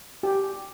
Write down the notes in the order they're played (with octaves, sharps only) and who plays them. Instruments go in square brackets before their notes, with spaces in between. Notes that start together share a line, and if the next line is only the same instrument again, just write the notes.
[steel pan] G4